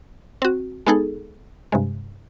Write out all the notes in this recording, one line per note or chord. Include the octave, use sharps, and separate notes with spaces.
C4 F#4
G#3 B3 D#4 G#4 A4
G2 C3 G#3